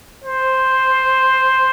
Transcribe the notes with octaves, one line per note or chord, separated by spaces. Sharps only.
C5